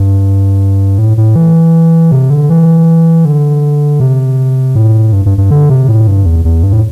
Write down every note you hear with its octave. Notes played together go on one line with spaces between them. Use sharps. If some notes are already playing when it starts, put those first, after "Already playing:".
Already playing: G2
A2
A2
E3
C3
D3
E3
D3
C3
A2
G2
G2
G2
D3
C3
A2
G2
E2
E2
G2
A2